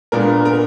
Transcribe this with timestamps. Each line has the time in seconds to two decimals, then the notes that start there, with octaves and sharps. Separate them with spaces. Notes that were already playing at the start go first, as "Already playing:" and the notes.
0.12 A#2 G#3 B3 D4 A#4
0.45 A#4